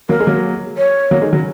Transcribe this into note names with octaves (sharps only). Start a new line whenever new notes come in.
F#3 A#3 A#4
G#3
F#3 A#3
C#5
F#3 A#3
D#3 G#3
C#3 F#3